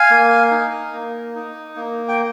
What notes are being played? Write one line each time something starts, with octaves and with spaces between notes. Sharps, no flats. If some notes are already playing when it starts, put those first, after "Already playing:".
Already playing: F5 G#5
A#3
D#4
A#3
D#4
A#3
G5